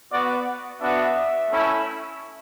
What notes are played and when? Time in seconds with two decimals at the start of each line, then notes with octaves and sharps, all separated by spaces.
0.11 B3 F#4 D5
0.80 B3 D4 F#4 E5
1.50 A3 C#4 E4